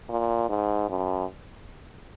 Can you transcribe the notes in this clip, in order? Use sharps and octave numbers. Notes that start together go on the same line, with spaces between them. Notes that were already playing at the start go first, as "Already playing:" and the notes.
A#2
G#2
F#2